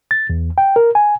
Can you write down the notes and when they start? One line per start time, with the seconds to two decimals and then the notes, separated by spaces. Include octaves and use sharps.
0.11 A6
0.30 E2
0.58 G5
0.76 A#4
0.95 G#5